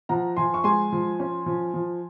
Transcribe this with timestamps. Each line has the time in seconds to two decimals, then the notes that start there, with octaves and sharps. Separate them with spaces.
0.09 F3 F#5 A#5
0.37 F3 G#5 C6
0.54 C#6
0.64 G#3 G#5 C6
0.92 F3
1.20 C#4
1.46 F3
1.74 F3